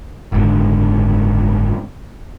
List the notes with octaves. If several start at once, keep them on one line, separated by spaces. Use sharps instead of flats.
F#1 G#2 D3